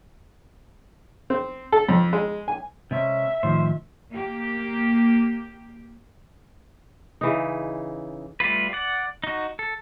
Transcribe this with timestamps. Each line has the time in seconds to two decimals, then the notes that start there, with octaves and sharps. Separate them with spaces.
1.30 C4
1.72 A4
1.89 F2
2.13 G#3
2.48 G#5
2.91 C3 G#3 C#4 E5
3.43 A2 D#3 F3 C5
4.11 A#3 G4
7.21 C#3 E3 D#4
8.40 G3 A3 F4 B4
8.73 D5 F#5
9.24 D#4 F#4
9.59 A4